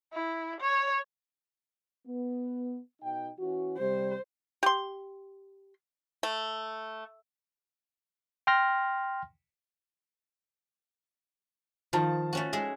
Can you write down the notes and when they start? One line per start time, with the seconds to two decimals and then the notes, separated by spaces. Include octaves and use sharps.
0.13 E4
0.61 C#5
2.06 B3
3.02 B2 D#4 G5
3.39 E3 C#4 F#4
3.78 C3 G3 C5
4.63 G4 C6
6.23 A3
8.47 G5 C6 F6 A#6
11.93 D#3 F3 F4 A5
12.33 A3 C#4 F#4
12.53 G#3 G#4 E5